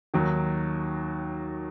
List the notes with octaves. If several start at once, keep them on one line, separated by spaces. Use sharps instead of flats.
D#2 D#3 F#3